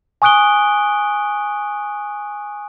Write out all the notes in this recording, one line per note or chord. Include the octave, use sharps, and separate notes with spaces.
G#5 C#6 D#6 F#6 D7 G7